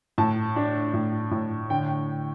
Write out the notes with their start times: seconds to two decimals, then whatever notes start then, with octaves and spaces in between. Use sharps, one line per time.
0.18 A2 A5
0.56 D4
0.94 A2
1.31 A2
1.70 D3 G5